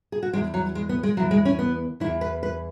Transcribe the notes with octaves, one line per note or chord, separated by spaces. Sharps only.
G#4
F#4
E2 C#3 E3 G#3
F#3
G#3
B3
G#3
E2 E3 F#3
G#3
C#4
B3
E2 E3 E4
B4
B4